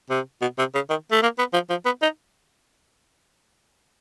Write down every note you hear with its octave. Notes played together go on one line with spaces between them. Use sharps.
C3
B2
C3
C#3
D#3
A3
A#3
B3
F3
F3
B3
D#4